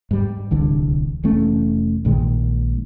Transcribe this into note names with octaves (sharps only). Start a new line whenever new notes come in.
G#2 G3
D1 C2 D3 E3
F1 E3 A3 C#4
A#1 A#2 D#3 G#3